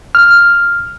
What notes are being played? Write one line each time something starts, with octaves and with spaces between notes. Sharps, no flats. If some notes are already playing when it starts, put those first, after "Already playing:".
F6